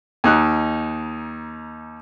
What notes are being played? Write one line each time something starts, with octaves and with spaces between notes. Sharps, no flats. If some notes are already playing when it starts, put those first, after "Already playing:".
D#2 D#4 F#6